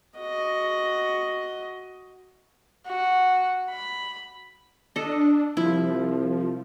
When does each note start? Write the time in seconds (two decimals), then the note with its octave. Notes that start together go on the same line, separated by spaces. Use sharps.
0.18 F#4 D#5
2.87 F#4
3.70 B5
4.96 D4 A4 D#5
5.57 C2 F3 E4